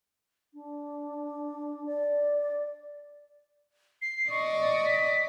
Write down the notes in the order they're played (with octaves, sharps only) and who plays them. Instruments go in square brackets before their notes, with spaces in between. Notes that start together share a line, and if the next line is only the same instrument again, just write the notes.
[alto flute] D4
D5
[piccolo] C7
[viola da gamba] D5 D#5 [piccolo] C#6
[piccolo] B6